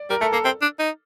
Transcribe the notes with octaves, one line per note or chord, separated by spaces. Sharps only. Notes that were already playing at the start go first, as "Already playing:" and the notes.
Already playing: D5
G3 A#4
A3 A4
A#3 A4
C4
D4
D#4